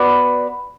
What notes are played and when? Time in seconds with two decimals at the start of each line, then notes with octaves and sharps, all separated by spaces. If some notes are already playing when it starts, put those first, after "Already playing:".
Already playing: B3 F#4 B4 D5